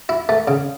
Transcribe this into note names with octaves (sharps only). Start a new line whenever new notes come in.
E4
A3
C#3